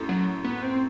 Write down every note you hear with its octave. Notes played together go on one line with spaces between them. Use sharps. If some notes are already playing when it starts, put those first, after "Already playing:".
Already playing: F#2 A2
F#3
B3
C4